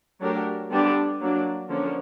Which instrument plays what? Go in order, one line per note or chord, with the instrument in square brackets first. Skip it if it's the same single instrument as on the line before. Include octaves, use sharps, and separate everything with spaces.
[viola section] F#3 A3 D4 G4 A#4
D3 G3 B3 D4 G4
F#3 A#3 D4
D3 F3 A#3 C#4